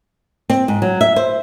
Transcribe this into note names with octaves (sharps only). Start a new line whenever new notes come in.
C4
G#2
F#3
E5
C5